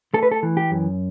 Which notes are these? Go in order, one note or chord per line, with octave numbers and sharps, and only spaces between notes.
A3 A4
B4
A4
E3
G4
F#2